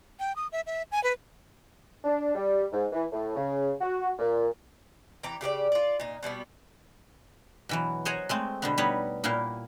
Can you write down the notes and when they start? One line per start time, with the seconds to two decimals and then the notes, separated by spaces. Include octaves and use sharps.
0.20 G5
0.36 D#6
0.52 E5
0.67 E5
0.92 G#5
1.04 B4
2.04 D4
2.35 G3
2.72 G#2
2.92 E3
3.12 A2
3.36 C#3
3.81 F#4
4.19 A#2
5.23 E3 G4 A#5
5.41 C#3 G4 G#4 D5
5.72 F4 D5
6.00 A#2 D#4
6.23 B2 G3 A3 B3
7.69 B2 E3 F#3
8.05 C5 C#5 D#5 F#5 G#5 A#5
8.29 G#3 A3 C4
8.62 B2 D3 B3
8.78 G3 B3 D#4 B4 C#5
9.24 A#2 A#3 B3 E4 F5 G5